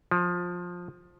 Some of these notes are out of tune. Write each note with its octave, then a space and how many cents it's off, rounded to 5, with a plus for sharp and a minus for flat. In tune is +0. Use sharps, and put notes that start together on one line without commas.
F3 +15